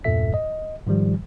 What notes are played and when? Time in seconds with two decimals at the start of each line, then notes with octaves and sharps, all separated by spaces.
0.04 E2 G2 A#2 A4 E5 B6
0.34 D#5
0.87 G#2 D#3 F3 G3